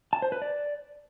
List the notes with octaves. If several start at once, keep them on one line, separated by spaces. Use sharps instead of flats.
A5
C5
B4
D5